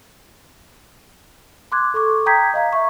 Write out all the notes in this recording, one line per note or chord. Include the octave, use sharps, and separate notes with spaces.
C6 D6 F#6 G#6
A4 C#6 D6
G5 A#5 D#6 G6 G#6 B6
D#5 F5 A#5
E5 C#6